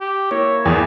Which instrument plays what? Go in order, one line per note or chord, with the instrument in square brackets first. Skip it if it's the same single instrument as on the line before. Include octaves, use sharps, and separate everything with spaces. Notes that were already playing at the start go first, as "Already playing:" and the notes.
[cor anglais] G4
[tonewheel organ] A#3 E4 [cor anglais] C#5
[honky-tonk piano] E2 [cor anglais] G#4